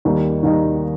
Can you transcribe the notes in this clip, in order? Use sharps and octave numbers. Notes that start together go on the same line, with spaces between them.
D#2 D#3 G3 A#3 D#4
D#2 D#3 G3 A#3 D#4